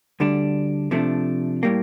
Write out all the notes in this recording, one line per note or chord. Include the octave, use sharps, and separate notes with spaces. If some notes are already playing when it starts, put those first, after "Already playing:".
D2 D3 G3 D4
C3 F3 A3 D4
A2 G3 A#3